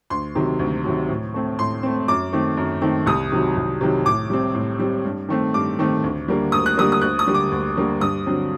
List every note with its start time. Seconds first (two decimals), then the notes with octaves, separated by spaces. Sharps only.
0.10 D2 C6
0.35 C3 D#3 F#3
0.59 D2
0.85 C3 D#3 F#3
1.09 A2
1.34 A3 C4
1.59 A2 C6
1.83 A3 C4
2.08 F#2 D6
2.33 D#3 A3 C4
2.57 F#2
2.82 D#3 A3 C4
3.06 C2 D#6
3.32 C3 D#3 F#3
3.57 C2
3.81 C3 D#3 F#3
4.05 A2 D6
4.30 G3 C4
4.54 A2
4.79 G3 C4
5.05 G2
5.29 D#3 A3 C4
5.54 G2 D6
5.79 D#3 A3 C4
6.03 D2
6.28 D3 G3 A#3
6.52 D2 D#6
6.66 F#6
6.77 D3 G3 A#3 D#6
6.92 D#6
7.01 D2 F#6
7.19 D#6
7.26 D3 G3 A#3
7.34 D6
7.52 D2
7.77 D3 G3 A#3
8.00 G2 D#6
8.26 D3 F#3 C4